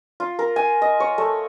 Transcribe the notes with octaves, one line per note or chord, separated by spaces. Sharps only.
F4
A#4
G#5
D#5
C#5
A3